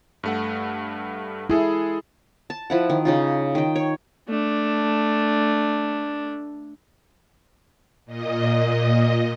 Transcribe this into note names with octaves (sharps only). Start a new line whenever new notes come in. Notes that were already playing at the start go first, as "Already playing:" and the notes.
G2 A3 F#5
G#3 E4 G#4 A4
A5
F3 E4 F#5
D#3
C#3 D#4 F4
D#3 G5
C#5
A3 D4
A#2 D#5